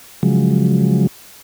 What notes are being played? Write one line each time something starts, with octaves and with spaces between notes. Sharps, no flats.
C#3 F3 F#3 G#3